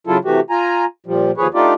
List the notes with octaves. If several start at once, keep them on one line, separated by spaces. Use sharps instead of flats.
C#3 F#3 E4 F4 A4
C3 E3 A3 F#4 G4
F4 G#5 A#5
A#2 F3 G3
D#2 F3 G#4 B4 C#5
A3 D4 D#4 F4 G4 D5